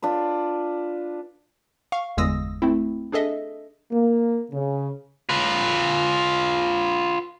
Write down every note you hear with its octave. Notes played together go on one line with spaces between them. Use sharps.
D4 F4 B4
F5 C#6
G1 E2 G#3 D#6 E6 A#6
A3 C4 E4
D4 G#4 A4 D#5 E5
A#3
C#3
F4 B4